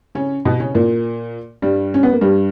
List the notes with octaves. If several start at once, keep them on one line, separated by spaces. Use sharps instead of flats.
C#3 C#4
B2 B3
C#3 C#4
A#2 A#3
G2 G3
C#4
B3
A#3
G2 G3